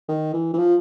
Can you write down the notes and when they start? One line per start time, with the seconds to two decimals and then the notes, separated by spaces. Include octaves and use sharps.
0.08 D#3
0.33 E3
0.53 E3
0.58 F3